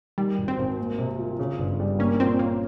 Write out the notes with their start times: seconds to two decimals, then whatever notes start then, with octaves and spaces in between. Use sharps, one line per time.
0.18 D#3 G3
0.38 G#1
0.48 C4
0.58 G#1
0.78 A#3
0.99 C3
1.18 F4
1.39 C#3
1.58 G1
1.80 G3
1.99 A#3 C#4
2.20 A#2 C4
2.39 A#3 C#4